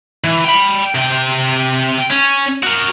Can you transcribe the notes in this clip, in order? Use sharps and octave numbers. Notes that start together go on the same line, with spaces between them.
E3
G5 B5
C3 G5
C#4
F#4 A#4